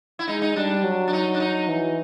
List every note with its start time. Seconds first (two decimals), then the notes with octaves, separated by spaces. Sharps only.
0.19 E4
0.27 G#3 D#4
0.42 D#4
0.56 G3 D4
0.84 F#3
1.08 D4
1.13 D#4
1.35 D4
1.40 D#4
1.69 E3